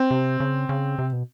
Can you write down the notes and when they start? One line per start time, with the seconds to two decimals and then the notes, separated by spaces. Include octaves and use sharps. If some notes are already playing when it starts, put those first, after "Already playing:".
Already playing: C4
0.11 C3
0.40 C#3
0.69 C#3
0.99 C3
1.13 B2